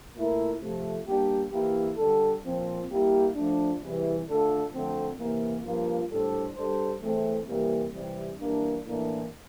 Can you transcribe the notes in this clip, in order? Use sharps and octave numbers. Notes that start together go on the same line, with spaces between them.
A#2 A3 E4 A#4
C3 F3 A3
G3 A#3 D4 G4
E3 A#3 E4 G4
D3 G3 D4 A4
A#2 F3 C4
G3 A#3 E4 G4
F3 A3 D4
E2 C3 E3 G3
D3 A3 D4 F4 A4
F2 D3 A3 C4
C3 E3 A#3
G2 F3 A#3 F4
A2 G3 D4 A4 C5
G3 D4 A4 C5
E2 E3 A3 C4
C3 E3 G3 A#3
C3 E3 G3
G2 E3 A#3 D4
A2 E3 A#3 D4